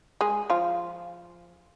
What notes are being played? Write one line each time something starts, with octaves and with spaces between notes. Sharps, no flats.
G#3 G#4
F3 F4